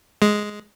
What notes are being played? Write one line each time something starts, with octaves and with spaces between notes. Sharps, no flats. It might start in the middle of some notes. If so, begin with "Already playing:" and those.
G#3